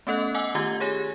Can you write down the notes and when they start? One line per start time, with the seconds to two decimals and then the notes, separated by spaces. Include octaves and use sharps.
0.07 A3 B3 C#4 A4 D#5 F#6
0.34 D#5 F#5 G#5 D6 E6
0.55 D#3 A3 F4 G4 G#6 G7
0.80 G4 G#4 C#5 G#5 A#6